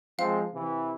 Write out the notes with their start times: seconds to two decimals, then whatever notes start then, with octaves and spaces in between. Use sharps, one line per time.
0.19 F3 G#3 C4 F5
0.55 C3 E3